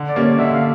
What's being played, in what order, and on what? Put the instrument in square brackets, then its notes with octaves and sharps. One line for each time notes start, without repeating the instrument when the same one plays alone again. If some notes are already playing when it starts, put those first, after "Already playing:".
Already playing: [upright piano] D3
[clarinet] D5
[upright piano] G3 A#3 C#4
[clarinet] D5
[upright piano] D3 [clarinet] E5
[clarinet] F5